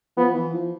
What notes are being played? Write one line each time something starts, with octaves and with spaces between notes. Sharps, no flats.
F3 B3
E3
F3